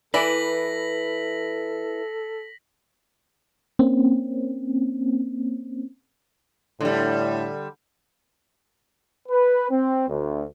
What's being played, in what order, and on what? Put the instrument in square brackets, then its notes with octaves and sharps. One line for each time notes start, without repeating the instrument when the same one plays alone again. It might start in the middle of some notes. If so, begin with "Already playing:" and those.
[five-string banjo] E3 D5 [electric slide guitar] E4 B4 [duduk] A4 [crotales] A#6 B6 F#7
[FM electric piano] A#3 C4 C#4
[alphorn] A2 [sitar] D3 G3
[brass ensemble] B4
C4
D2